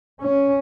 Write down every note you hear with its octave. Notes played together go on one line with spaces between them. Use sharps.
C#4